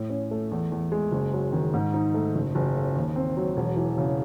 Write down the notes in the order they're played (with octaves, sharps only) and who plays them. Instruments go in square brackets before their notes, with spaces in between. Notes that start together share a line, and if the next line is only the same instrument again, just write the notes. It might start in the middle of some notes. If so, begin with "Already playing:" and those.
Already playing: [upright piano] A2
C#4
A3
E2
E2
G#3
F#1
F#3
D#3
G#2
D#4
A3
F#1
F#1
C#3
D#2
C4
F#3
E1
E3
C#3